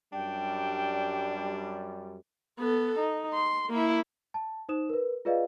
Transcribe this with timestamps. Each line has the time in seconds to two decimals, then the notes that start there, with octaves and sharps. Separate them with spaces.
0.13 F#2 G3 D4 G5
2.59 B3 A4
2.99 D#4
3.34 C6
3.69 A#3 E4
4.34 A5
4.69 D#4 C5 D#6 E7
4.89 A#4 B4
5.25 F4 G#4 B4 D5 D#5 F5